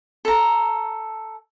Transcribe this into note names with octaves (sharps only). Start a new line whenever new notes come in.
A4 A#5